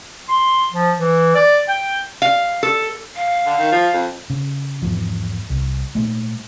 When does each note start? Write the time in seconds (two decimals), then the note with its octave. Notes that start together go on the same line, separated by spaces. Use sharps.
0.28 C6
0.72 F3
0.97 E3
1.35 D5
1.68 G5
2.22 F5
2.63 A4
3.16 F5
3.46 D3
3.59 D#3
3.72 F3
3.93 F2
4.30 C#3
4.82 E2 G#2 F3
5.50 C2
5.95 A#2 G#3 A3